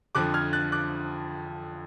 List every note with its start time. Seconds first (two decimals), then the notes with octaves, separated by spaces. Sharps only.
0.15 F2 D3 F3 D6 F#6
0.34 F6 G#6
0.53 F#6 A6
0.72 D6 F#6